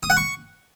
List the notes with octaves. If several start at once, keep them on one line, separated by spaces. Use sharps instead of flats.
D#6
F#5
C#6